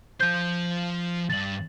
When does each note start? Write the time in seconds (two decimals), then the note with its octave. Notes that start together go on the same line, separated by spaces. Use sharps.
0.21 F3 C5 G6
1.30 E2 G2 A6 F#7